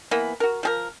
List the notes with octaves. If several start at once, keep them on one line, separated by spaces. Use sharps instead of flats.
E3 A#3 B3 B5
F#4 A#4
F3 G#4 A#4